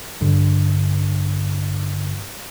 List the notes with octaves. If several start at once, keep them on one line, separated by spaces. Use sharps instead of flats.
A#1 G2 D3